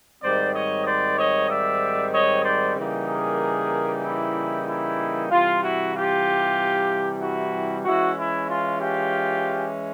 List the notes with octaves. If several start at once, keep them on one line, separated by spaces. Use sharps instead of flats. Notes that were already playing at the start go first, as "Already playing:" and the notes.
G#2 D#3 G3 C4 C5 D5
C#5 D#5
C5 D5
C#5 D#5
D5 E5
C#5 D#5
C5 D5
C#3 E3 G3 A#3 D#4
G#4 A#4
E4
E4
C3 E3 G3 F4
E4 F#4
F4 G4
E4 F#4
E3 G#3 C#4 E4 F#4
E4
F4
F4 G4